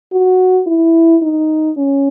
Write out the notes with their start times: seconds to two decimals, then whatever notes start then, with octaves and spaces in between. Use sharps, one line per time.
0.12 F#4
0.67 E4
1.22 D#4
1.77 C#4